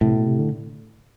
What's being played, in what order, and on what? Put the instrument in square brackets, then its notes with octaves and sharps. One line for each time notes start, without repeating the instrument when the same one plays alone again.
[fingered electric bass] A2 [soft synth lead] C3
[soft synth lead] B2
C3
D3